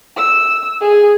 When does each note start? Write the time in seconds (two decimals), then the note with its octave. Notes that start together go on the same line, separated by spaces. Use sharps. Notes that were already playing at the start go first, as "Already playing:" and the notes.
0.16 E6
0.81 G#4